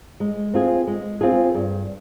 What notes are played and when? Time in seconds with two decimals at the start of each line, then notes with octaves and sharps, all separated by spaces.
0.20 G#3
0.54 C4 F4 G#4
0.87 G#3
1.21 C4 F4 G#4
1.54 G2